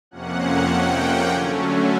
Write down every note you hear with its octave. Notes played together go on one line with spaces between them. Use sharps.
F2 C3 F3 A#3 C#4 F#5
G5
D3 F#3 A3 C#4